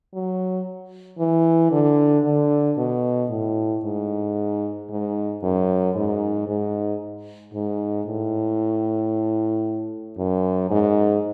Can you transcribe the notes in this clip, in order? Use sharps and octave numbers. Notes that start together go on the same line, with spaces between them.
F#3
E3
D3
D3
B2
A2
G#2
G#2
F#2
G#2
G#2
G#2
A2
F#2
G#2